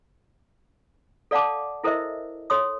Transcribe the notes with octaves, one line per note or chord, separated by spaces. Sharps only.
A4 D5 F5 F#5 A5 D6
E4 A4 A#4 C5 D#5 E5
A4 C#5 C6 D#6